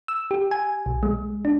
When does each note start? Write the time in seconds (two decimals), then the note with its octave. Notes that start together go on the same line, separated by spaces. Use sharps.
0.08 E6
0.31 G4
0.51 G#5
0.86 B1
1.03 G#3
1.45 D4